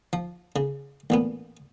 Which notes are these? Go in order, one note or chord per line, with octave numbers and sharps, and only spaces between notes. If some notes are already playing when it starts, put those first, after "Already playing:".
F3
C#3
A1 A#2 B3